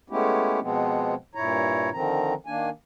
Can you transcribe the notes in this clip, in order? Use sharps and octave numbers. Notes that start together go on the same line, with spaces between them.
G#3 A3 B3 C#4 E4 G4
B2 F3 G#3 B3 C4
G2 A#2 E4 C#5 A#5
D3 D#3 F3 C4 A#5
D#3 A#3 D4 G#5